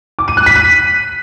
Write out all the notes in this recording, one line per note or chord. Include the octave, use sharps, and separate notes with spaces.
D6
D#7
F#6
B6
D#7